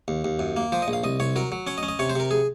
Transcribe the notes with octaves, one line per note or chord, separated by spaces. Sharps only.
D#2
D#2
F#2
A#3
F3 C5
D#5
A#1
F5
C2 D#5
C2 C#5
F#3 A#4
F#3
C#4 C#5
D#5
C#4
D#5
C3 C#5
C5
C3 A#4
G#4